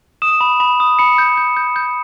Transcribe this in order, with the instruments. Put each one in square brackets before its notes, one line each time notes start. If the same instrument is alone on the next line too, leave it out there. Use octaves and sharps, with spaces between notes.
[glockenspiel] D#6 E7
B5
B5
D#6
B5 C#7
G6
G6
G6
G6